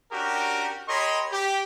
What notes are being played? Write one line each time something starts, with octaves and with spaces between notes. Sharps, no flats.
C#4 D4 F#4 G4 A#4
G4 A#4 C#5 D#5 B5 C6
G4